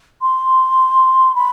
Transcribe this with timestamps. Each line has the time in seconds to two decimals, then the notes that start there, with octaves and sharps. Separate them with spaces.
0.22 C6
1.35 B5